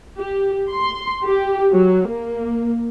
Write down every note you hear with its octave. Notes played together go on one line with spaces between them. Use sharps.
G4
C6
G4
F#3
A#3